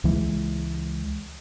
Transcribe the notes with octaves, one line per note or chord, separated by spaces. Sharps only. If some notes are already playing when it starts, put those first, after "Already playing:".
C#2 E3 G#3